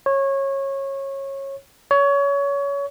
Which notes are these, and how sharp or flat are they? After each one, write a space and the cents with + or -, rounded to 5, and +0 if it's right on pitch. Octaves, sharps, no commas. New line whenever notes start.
C#5 -20
C#5 +25